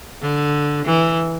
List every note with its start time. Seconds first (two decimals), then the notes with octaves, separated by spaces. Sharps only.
0.22 D3
0.85 E3